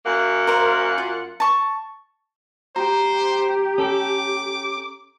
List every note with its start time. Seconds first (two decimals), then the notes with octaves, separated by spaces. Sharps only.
0.05 F#2 A#3 F#5
0.47 A#4 C5 F5
0.98 F4
1.40 A5 C#6
2.76 G4 C5 A#5
3.78 C#4 A4 D6